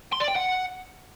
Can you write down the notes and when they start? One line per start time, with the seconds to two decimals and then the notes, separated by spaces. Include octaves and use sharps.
0.13 C6
0.20 D5
0.28 G5
0.36 F#5